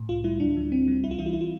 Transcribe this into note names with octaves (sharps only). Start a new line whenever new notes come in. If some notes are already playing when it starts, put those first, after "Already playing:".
Already playing: A2
C2 F4
G3 E4
D2 D4
F3
D2 C4
G3
C2 E4
F4
E3 E4
F4
E4
F4